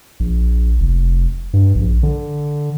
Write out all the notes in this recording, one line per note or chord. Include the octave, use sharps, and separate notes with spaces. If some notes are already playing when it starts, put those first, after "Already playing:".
A#1
F1
G2
A#1
D3